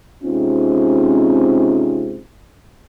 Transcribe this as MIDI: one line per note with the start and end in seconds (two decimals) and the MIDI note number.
0.24 2.19 48
0.24 2.19 56
0.24 2.19 60
0.24 2.19 61
0.24 2.19 63
0.24 2.19 65